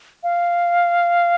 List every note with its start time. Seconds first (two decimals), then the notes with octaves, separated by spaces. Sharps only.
0.23 F5